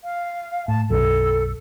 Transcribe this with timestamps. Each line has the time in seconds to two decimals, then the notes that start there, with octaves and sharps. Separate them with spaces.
0.04 F5
0.68 A2 A5
0.90 B1 F#2 A4